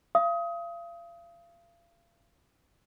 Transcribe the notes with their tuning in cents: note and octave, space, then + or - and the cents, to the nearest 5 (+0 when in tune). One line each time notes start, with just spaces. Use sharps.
F5 -35 D#6 +25